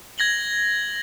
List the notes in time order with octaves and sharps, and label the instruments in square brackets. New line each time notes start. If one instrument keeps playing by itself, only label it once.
[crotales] G#6 A#6 F#7 G7